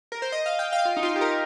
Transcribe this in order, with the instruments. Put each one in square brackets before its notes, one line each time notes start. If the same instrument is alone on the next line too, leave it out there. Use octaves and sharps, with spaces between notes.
[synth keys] A#4
C5
D#5
F5
G5
F5
F4
D#4
F4
G4
A#4